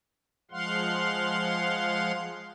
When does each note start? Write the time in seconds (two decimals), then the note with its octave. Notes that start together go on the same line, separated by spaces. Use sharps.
0.51 F3 G#3 F5 F#5 C6